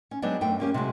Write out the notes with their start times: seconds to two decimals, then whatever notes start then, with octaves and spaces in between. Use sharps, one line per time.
0.11 C#4
0.22 F#3 G#3 B3 C4 D4
0.41 F#2 A3 G5
0.60 A#3 C#4 G4
0.74 C3 F#3 G#3